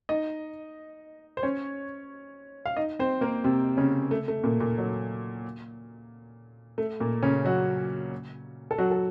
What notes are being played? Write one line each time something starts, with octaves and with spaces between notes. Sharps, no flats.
D#4 D#5
C5
C#4 C#5
F5
D#4 D#5
C4 C5
A#3 A#4
C3 C4
C#3 C#4
A3
A3
A#2 A#3
A#2 A#3
F#3
A3
A#2 A#3
C#3 C#4
F#3 F#4
A4
F#3 F#4
A4